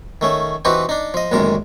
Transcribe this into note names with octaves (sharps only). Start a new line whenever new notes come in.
D#3 A3 C#4
E3 C4 D#4 F#4 G4 B4
D4 D#4
F3 D#5
A1 F#2 A#2 D#3 G#3 A#4